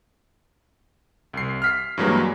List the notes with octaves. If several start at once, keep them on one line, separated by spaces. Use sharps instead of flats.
C2 C7
F6 B6 C7
G2 E3 F#3 G#3 A#3